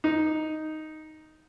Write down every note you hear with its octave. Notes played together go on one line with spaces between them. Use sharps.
D#4